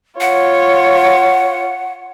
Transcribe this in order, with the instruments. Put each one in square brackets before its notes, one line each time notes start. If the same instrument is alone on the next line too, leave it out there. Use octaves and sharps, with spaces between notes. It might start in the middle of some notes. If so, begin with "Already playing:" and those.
[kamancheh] F4 C#5 [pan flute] F#5